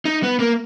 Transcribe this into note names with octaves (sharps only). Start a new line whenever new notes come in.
D#4
B3
A#3